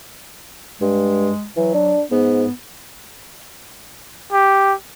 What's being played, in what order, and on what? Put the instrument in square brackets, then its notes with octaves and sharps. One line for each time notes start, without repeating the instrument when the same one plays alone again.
[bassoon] G2 [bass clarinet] G#3
[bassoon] E3 [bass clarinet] F#3
[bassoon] D4
[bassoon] G#2 [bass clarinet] B3
[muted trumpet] G4